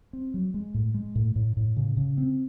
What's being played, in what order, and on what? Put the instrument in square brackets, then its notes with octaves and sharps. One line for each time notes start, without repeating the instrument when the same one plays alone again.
[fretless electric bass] C4
F#3
G#3
A2
G#3
A2
A2
A2
C#3
C#3
C4